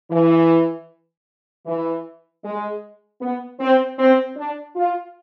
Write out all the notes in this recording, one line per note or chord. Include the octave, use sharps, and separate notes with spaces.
E3
E3
G#3
B3
C4
C4
D4
F4